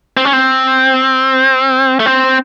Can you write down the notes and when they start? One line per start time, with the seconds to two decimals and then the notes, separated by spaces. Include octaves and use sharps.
0.17 C4
0.25 C#4
0.33 C4
2.00 A3
2.06 C4